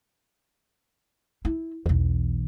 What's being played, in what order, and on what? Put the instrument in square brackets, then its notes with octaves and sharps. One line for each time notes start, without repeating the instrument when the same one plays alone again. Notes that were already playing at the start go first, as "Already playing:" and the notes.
[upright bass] E4
[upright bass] B1 E3 [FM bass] E2